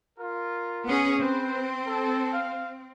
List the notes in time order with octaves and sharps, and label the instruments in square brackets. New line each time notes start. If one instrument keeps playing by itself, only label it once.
[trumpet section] F4 A#4
[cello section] B3 C#4 G#4
[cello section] C4 [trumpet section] B4 C5
[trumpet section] A4
F5